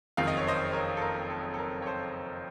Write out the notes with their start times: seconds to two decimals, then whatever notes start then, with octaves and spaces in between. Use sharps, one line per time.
0.17 F#1 F2 D#3 F5
0.27 D#5
0.37 C#5
0.47 C5 D#5
0.73 A#4 C#5
0.97 A4
1.02 A#4
1.30 A4
1.54 A4
1.59 A#4
1.82 C#5
1.86 A4 C5